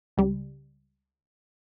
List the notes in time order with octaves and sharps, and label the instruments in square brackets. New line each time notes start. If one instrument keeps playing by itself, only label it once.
[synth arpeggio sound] C#2 G3